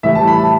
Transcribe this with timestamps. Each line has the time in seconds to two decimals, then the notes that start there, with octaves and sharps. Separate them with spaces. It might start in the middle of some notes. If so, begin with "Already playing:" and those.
0.03 A2 E3 G3 E5
0.15 A5
0.27 B5
0.39 A5